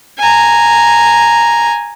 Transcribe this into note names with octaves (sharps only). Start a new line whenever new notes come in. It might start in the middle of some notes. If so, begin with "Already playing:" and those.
G#5 A#5